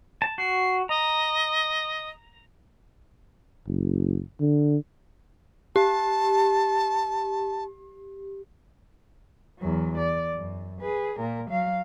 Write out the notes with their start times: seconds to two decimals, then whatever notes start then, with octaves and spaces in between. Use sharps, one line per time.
0.22 A5
0.38 F#4 C7
0.89 D#5 A#5
3.67 F#1
4.40 D3
5.76 G4 A5
9.59 E2 F#3
9.98 D5
10.34 F#2
10.81 G#4 B4
11.19 A#2 A#4
11.50 F#3 F5